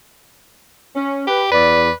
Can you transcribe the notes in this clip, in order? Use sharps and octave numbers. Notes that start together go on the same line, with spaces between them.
C#4
G4 B4
E2 B4 D5